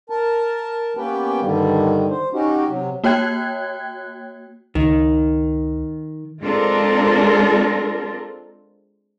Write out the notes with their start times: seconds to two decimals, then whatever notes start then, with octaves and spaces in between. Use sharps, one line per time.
0.10 A#4 A5
0.97 A#3 B3 C#4 G4 B4 G5
1.41 G2 D3 D#3 G3
2.10 C5
2.33 C#4 D#4 F#4 G4
2.69 C3 F#3
3.04 A#3 F#4 C#5 G5 F#6 G#6
4.75 C#2 D#3
6.42 G#3 C4 D4 F4 A4 A#4